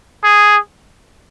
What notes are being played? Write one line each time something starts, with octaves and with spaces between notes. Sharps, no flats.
G#4